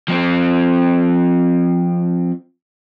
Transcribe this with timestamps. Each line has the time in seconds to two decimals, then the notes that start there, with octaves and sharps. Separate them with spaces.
0.08 F3 C4